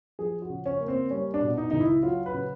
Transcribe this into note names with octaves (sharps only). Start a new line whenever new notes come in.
F3 G#4
F#4
C#3
C#4
A#3
C4
G3 C#4
D4
B2
D#4
C#2 D#4
E4
F#3 F4
B4
C#3